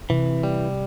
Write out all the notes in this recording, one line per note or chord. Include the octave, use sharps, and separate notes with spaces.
C3 E3
G3